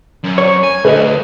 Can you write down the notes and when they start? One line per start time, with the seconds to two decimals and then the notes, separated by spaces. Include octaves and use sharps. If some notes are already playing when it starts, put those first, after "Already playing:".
0.24 F#2
0.38 C#5
0.64 G#5
0.85 D2 B4 D#5